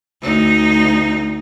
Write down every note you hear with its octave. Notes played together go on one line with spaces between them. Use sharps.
D2 D#4